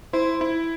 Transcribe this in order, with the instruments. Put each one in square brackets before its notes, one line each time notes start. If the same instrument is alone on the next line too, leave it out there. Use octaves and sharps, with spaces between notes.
[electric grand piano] E4 [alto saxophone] C5
[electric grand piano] E4